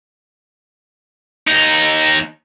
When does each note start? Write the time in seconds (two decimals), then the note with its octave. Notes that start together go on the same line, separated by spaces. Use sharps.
1.47 D#2 D#4